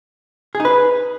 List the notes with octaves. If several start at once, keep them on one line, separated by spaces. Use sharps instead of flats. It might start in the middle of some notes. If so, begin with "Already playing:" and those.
G#4
D#4
B4